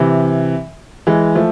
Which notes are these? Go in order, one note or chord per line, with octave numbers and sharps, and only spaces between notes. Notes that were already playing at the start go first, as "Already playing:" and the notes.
Already playing: C3 E3
E3 G#3
F3 A3